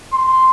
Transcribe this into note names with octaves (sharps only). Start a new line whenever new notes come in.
C6